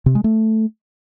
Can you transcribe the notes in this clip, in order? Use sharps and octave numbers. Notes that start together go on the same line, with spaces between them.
C3
G#3
A3